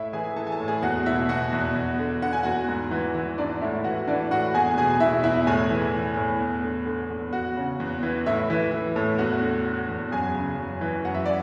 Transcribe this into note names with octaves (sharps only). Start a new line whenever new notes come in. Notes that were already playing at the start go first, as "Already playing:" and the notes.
Already playing: A2 E4 E5
E3 G#4 G#5
E3 A4 A5
G#5
A4 A5
A2
G#4 G#5
E2 F#4 F#5
B2 E4 E5
B2 F#4 F#5
E2
E2
D3
D3 F#5
G#5
E2 F#4 F#5
G#2
E3
E3
G#2 D4 D5
A2 E4 E5
E3 F#4 F#5
E3 D4 D5
A2 F#4 F#5
E2 G#4 G#5
B2 G#4 G#5
B2 E4 E5
E2 E4 E5
A2 G#4 G#5
E3
E3
A2
E2
D3
D3
E2
E2 F#4 F#5
C#3
E2
E3
A2 E4 E5
E3
E3
A2
E2 F#4 F#5
D3
D3
E2
F#2 G#4 G#5
C#3
F#2
E3
F#2 F#5
E5
D5